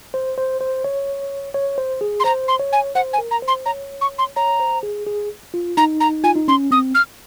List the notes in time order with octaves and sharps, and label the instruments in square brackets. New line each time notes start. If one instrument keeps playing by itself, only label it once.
[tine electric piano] C5
C5
C5
C#5
C#5
C5
G#4
[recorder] C6
[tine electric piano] C5 [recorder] A#5
[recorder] C6
[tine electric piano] C#5
[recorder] G#5
[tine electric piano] C5 [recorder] F#5
[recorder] G#5
[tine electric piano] A#4
[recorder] A#5
[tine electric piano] C5
[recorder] C6
[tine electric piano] C#5 [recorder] A#5
[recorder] C#6
C6
[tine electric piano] C#5 [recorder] A#5
[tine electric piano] C5
G#4
G#4
F4
[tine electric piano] D#4 [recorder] A#5
[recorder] A#5
[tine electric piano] F4 [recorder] G#5
[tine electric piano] D#4
[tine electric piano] C#4 [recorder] C6
[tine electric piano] C4 [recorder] D#6
[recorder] F6